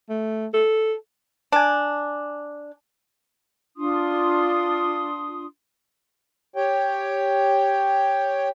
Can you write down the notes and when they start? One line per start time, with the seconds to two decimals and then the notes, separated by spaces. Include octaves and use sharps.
0.09 A3
0.54 A4
1.52 D4 G#5 D6
3.77 D4 F4 C6 D#6
6.56 G4 C#5 G5